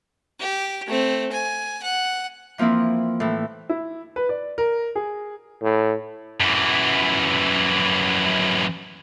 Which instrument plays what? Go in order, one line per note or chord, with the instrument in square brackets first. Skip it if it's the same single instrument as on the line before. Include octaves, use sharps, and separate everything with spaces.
[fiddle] G4
A3 C4
G#5
F#5
[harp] E3 F3 A#3 C4 E4
A2 E3
[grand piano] E4
B4
D5
A#4
G#4
[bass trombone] A2
[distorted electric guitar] F#2 E3